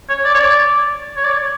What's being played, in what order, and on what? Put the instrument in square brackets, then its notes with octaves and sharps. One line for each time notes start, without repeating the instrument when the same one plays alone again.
[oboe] C#5
D5
C#5
D5
C#5
D5
C#5